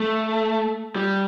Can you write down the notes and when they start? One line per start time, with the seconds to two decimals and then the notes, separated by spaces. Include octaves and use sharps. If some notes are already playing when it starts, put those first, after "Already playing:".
Already playing: A3
0.96 G3